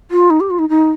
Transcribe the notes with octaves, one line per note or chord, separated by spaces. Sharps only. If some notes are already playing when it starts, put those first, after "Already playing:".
F4
D#4
G4
F4
D#4
D#4